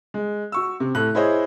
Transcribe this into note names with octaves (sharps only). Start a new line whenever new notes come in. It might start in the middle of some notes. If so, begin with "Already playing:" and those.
G#3
F#4 C#6 E6
C3
A2 A4 F#6
E4 G#4 C5 C#5 D#5